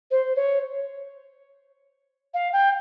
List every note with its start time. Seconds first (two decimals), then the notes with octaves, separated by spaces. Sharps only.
0.10 C5
0.35 C#5
2.33 F5
2.52 G5